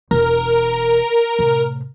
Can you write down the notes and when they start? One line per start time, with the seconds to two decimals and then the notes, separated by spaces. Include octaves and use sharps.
0.11 E1 A#4
1.39 A2 C3